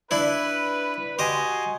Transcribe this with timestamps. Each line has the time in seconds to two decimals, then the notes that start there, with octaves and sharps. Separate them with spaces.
0.11 D4 E4 B4
1.19 F#4 G4 D#5 G#5 C6